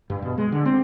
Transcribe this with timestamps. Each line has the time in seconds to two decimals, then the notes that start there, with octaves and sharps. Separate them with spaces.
0.10 G2
0.22 B2
0.38 G#3
0.52 D3
0.66 C4